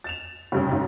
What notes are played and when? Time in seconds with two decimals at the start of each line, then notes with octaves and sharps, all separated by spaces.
0.04 A6 E7 F7
0.52 F1 G2 C#3
0.70 B1 G#2 C#3